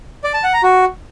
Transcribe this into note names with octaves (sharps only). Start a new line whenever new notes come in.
D5
A5
F#5
A#5
F#4